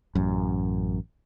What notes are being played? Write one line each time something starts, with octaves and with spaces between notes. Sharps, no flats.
A1 F#2